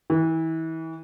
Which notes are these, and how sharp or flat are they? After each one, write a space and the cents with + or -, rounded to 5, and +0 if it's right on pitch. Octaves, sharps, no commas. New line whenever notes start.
E3 -30